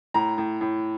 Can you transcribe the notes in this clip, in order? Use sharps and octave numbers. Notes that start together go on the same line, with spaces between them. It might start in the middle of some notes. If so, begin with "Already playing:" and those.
A2 A#5
A2
A2